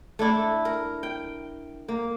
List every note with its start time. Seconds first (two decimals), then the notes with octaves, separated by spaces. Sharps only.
0.19 A3 D4 E4 A4
0.65 A#4
1.03 G5
1.88 A#3